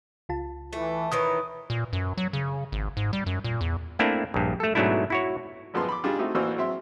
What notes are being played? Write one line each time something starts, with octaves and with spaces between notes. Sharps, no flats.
C#2 F4 A5
E3 A3
D#3 E3 B4 C#5 D#6
A#2
F#2
F#3
C#3
G#1
G#2
G3
F#2
A#2
E2
A3 A#3 C4 D4 E4
A#1 G2
A3 A4
G#2 B2 F#3 A3 D4 E4
E4 F#4 C#5
A1 F#2 F3 G#3 B3 C6
B5 C6 D6
G3 D4 D#4 F4 G#4
A3 C4 D#4 E4 F#4 G4
A1 E3 A#3 F#4 C5 E6
F#3 G#3 C4 E5 C6